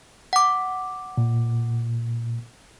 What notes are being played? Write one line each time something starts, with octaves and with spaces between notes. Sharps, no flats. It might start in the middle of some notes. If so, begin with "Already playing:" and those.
F#5 D6
A#2